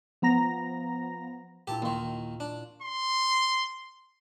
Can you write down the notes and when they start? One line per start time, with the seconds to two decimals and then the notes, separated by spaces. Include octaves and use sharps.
0.22 F3 B3 A#5 A#6
1.67 A#2 E4 G4 A5
1.82 D#2 D#3 F5 C6 C#6
2.40 D4
2.82 C6